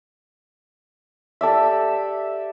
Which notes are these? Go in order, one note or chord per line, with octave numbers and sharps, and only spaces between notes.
G4 A4 D5 E5